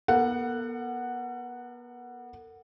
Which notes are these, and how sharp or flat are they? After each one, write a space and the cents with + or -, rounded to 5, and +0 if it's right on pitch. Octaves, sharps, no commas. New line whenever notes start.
B3 -35 A4 +45 F#5 +0